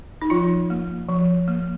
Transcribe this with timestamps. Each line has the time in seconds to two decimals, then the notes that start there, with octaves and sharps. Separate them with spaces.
0.22 D#4
0.30 F3 F4
0.70 A#3
1.09 F3
1.48 A#3